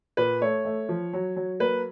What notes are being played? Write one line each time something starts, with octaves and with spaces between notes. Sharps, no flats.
A#2 B4
A3 C#5
A3
F3
F#3
F#3
A#3 B4